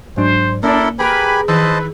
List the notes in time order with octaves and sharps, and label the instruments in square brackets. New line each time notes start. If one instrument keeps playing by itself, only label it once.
[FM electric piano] G#2 F#3 D4 [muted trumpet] C5
[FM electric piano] A#3 [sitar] C#4 [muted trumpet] D4 [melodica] E4 A4 A#4
[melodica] G4 G#5 B5 [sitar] G#4 A#4 [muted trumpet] B4
[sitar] D#3 [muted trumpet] B4 [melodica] C5 D#5 A5 [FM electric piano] E6